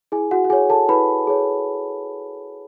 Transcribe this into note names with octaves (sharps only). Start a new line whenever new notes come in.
E4 G#4 G#5
F#4 F#5
F#5
G#4 C#5 G#5
A4 A5
E4 B4 B5
G#4 C#5